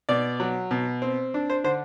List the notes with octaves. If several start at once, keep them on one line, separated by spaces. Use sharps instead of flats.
B2 D5
F#3
B2
C4
D4
C5
D3 C5